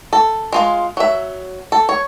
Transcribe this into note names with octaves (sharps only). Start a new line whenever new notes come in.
A4
G#3 F4 F5
F#3 E5
A4
C#5